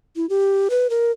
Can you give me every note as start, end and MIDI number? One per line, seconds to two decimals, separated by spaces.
0.16 0.28 64
0.29 0.68 67
0.70 0.90 71
0.90 1.11 70